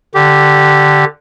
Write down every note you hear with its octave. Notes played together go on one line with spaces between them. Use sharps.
D3 G4